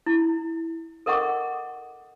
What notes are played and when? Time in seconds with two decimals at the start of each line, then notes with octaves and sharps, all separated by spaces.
0.06 E4
1.06 A4 A#4 D#5 F#5 C#6 D6